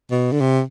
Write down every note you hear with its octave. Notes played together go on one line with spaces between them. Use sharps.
B2
D3
C3